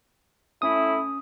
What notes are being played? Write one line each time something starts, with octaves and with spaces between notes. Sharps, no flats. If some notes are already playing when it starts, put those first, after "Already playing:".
A2 A3 C#4 E4 D#6